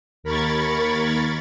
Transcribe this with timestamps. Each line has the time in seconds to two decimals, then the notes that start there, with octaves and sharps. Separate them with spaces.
0.23 D#2 A#4 B5 C#6 G#6 A6